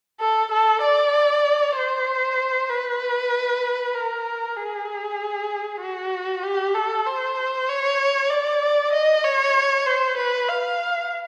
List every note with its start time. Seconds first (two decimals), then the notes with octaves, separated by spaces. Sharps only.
0.20 A4
0.51 A4
0.82 D5
1.76 C5
2.70 B4
3.94 A#4
4.56 G#4
5.81 F#4
6.43 G4
6.75 A4
7.06 C5
7.68 C#5
8.30 D5
8.93 D#5
9.24 C#5
9.86 C5
10.17 B4
10.49 F5